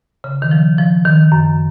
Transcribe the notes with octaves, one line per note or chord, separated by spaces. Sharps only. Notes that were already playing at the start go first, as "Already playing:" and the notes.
C#3
D#3
F3
F3
D#3
F#2